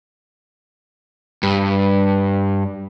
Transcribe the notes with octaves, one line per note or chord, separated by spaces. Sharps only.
G2